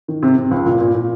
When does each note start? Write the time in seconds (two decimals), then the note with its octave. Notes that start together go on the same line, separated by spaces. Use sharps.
0.08 D#3
0.23 C3
0.37 C3
0.51 C#2
0.66 A#2
0.81 A#2
0.94 A#2